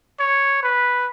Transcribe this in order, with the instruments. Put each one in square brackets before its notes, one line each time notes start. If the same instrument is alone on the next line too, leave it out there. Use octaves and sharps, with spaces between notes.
[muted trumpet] C#5
B4